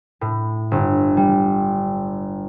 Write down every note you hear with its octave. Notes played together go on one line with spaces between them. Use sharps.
A2
G1
G3